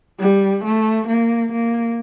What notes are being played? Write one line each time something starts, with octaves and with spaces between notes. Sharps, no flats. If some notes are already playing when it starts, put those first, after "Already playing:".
G3
A3
A#3
A#3